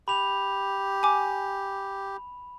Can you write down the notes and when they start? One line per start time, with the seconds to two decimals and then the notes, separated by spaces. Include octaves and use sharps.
0.08 G4 B5 F7
1.03 G#5 D6